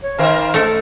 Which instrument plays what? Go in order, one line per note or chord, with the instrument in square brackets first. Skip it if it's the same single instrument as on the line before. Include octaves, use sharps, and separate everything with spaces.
[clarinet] C#5
[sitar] D#3 A#4 C5 [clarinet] F5
[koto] A3 A4